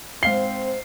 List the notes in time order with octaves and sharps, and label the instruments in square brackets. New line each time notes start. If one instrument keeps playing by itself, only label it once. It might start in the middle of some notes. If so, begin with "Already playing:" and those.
[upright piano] G#2 F5 G7 [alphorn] C4 [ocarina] C5 [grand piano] C7